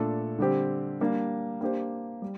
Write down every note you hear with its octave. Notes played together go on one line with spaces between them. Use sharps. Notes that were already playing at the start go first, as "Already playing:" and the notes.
Already playing: A#2 A3 D4 A4
D3 G3 C4 G4
G3 A#3 D4
A#3 D4 G4 C5
G3